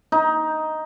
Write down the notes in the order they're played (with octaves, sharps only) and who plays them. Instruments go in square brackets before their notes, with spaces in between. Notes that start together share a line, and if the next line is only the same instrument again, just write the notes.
[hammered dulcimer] D#4